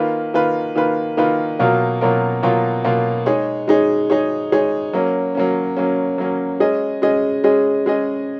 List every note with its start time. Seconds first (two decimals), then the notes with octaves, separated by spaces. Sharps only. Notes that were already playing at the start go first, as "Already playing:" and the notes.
Already playing: D#3 A#3 F4 B4
0.34 D#3 A#3 F4 B4
0.76 D#3 A#3 F4 B4
1.17 D#3 A#3 F4 B4
1.59 B2 F#3 A#3 F4 A#4
2.01 B2 F#3 A#3 F4 A#4
2.43 B2 F#3 A#3 F4 A#4
2.85 B2 F#3 A#3 F4 A#4
3.26 G#3 D#4 G#4 C#5
3.68 G#3 D#4 G#4 C#5
4.10 G#3 D#4 G#4 C#5
4.52 G#3 D#4 G#4 C#5
4.93 F#3 A#3 C#4
5.35 F#3 A#3 C#4
5.77 F#3 A#3 C#4
6.18 F#3 A#3 C#4
6.60 G#3 C#4 G#4 D#5
7.02 G#3 C#4 G#4 D#5
7.44 G#3 C#4 G#4 D#5
7.86 G#3 C#4 G#4 D#5